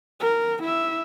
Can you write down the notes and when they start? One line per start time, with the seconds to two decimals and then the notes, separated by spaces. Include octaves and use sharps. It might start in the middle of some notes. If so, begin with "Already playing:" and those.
0.20 A#4
0.63 E4 E5